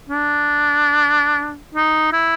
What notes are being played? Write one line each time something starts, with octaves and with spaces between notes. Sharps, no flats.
D4
D#4
E4